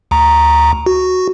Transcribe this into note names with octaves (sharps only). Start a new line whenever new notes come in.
D2 A#5
F#4